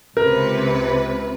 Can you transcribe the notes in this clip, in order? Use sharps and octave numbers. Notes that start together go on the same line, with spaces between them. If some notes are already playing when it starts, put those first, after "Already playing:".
C#2 C3 A#4 B4